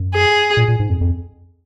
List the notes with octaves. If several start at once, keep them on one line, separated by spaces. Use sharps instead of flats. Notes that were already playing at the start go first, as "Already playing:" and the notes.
Already playing: F#2
G#4
A#2
A#2
G#2
F2
F2